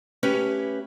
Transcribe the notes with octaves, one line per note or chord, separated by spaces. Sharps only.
A3 C#4 E4 G4 B4 C#5